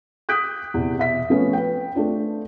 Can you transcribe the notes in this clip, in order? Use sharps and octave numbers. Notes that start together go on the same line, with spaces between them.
D#6 F#6 G6 B6 D7
E2 C3
B2 E5 B6
F3 A3 B3 C#4
B4 G5
A3 C4 D4 F4